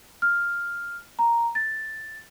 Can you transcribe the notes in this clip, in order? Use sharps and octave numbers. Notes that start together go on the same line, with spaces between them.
F6
A#5
A6